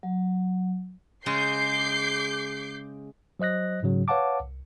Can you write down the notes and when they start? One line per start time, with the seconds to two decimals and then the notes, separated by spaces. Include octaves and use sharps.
0.03 F#3
1.26 C#3 G#3 D6 G6 C7
3.39 F#3 C5 D#5 F#6 A#6
3.83 G#2 C#3 F#3
4.08 B4 C#5 F5 F#5 A5 D6
4.40 C2